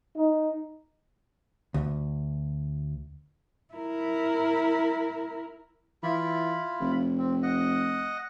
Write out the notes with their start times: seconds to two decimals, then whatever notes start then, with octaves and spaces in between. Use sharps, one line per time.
0.16 D#4
1.74 D2
3.74 E4 A#4
6.03 E3 E4 F4 B5
6.80 F1
7.18 C4
7.43 D#5 F#5